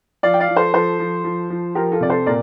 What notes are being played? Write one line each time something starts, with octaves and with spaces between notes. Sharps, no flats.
F3 D5 F5
G5
D5 F5
F3
A4 C5
F3 A4 C5
F3
F3
F3
F3 G4 A#4
F4 A4
C3 D5
A4 C5
A#2 A#4 D5